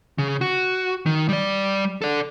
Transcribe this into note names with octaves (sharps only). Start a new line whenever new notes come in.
C#3
F#4
D#3
G3 D5
A4 D5